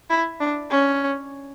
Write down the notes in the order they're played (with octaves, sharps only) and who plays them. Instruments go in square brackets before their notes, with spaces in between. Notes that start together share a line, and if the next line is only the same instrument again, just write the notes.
[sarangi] E4
D4
C#4